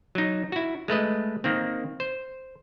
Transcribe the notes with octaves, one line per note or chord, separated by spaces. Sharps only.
F#3 D#4
E4 F#4
G#3 A3 B4 D#5
D#3 A#3 C4
C5